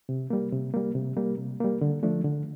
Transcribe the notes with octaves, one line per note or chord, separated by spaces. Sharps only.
C3
G3 A#3
C3
G3 A#3
C3
G3 A#3
C3
G3 A#3
D3
F3 A3 D4
D3